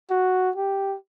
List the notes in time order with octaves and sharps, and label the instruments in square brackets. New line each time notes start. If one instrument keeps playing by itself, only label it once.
[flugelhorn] F#4
G4